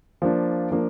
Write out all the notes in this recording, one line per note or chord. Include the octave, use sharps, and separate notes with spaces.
F3 A#3 D4
F3 A#3 D4